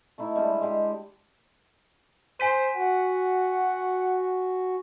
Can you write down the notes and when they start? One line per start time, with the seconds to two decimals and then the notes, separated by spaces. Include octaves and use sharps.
0.18 A3 D#4 E4 A4
0.35 G3 G#3 D4 E5
0.61 G#3 G4
2.40 C5 G#5 B6 D#7
2.76 F#4 F#5